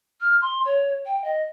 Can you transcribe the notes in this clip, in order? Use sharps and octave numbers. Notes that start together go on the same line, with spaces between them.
F6
C6
C#5
G5
D#5